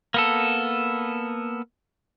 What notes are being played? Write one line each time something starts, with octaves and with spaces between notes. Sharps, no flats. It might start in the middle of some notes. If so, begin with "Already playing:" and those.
A#3 B3 A4